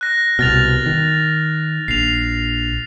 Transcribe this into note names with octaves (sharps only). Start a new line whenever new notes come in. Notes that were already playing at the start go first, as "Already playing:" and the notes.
F#6 A#6
C2 B2 F6 A6 F7
D#3
A#1 C7 F7